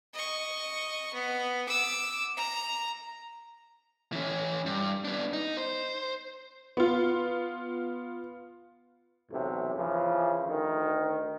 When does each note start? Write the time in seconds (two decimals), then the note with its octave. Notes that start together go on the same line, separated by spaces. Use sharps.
0.14 D#5 C#6
1.14 B3
1.68 D6 E6
2.37 A#5
4.12 E3 C#4
4.66 G2
5.04 B3 D4
5.33 D#4
5.57 C5
6.77 B3 F4
9.31 B1 E2 A2 C3
9.75 C#3 E3 F3
10.46 D2 D#3